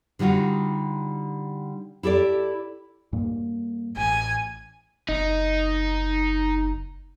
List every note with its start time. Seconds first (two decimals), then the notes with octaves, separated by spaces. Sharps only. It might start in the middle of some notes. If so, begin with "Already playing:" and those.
0.19 D3 G3 D#4 F4 F#4
2.03 E4 G4 A4 D5
3.13 G2 A#3
3.97 A1 G#5
5.09 F#1 D#4